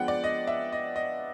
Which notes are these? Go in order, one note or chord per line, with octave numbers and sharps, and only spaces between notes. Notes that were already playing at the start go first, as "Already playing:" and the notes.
Already playing: F3 G#3 B3 D4 F#5 G5
D5
D#5
E5
D#5
D#5